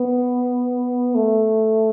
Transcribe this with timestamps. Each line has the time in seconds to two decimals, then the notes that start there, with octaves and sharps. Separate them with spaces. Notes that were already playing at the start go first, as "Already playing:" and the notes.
Already playing: B3
1.15 A3